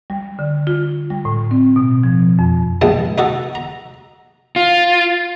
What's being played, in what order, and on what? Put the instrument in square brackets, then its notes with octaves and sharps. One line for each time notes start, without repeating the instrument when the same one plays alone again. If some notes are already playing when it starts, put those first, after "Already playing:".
[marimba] G3
D3
F4
G3
A2
C4
B2
F3
F2
[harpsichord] A#1 G2 G#3 A5
D#4 F#4 A4
A#5
[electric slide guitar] F4